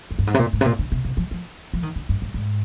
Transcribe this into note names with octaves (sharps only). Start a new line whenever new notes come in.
F2
G2
G#2
C3
A#2
G#2
C3
A#2
D3
C3
C3
F3
F3
F3
D#3
D3
G2
G2
G#2